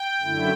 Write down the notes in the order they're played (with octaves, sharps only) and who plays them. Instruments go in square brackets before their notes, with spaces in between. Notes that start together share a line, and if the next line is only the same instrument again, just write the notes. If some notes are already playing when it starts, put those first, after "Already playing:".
Already playing: [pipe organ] G5
F#2 D3 A3 E4